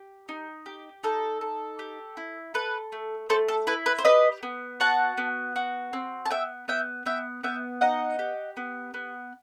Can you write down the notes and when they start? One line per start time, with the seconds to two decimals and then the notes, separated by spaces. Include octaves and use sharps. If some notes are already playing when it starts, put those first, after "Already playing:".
Already playing: G4
0.29 D#4
0.66 G4
1.03 D#4 A4
1.41 A4
1.79 G4
2.17 E4
2.54 A4 B4
2.92 A3
3.29 A3 A4 C5
3.48 A4
3.67 E4 B4
3.86 B4
3.98 C5
4.05 G4 B4 D#5
4.43 B3
4.80 F#4 F#5 A5
5.18 B3
5.56 F#4
5.93 C4
6.26 A5
6.31 B3 E5 G5
6.68 B3 E5 G5
7.06 B3 E5 G5
7.43 B3 E5 G5
7.81 D#4 D#5 F#5
8.19 G4
8.57 B3
8.94 B3